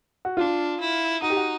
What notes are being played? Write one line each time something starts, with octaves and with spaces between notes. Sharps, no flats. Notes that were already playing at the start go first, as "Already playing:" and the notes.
F#4
D4 F4
E4
D#4 F#4
G4
F#4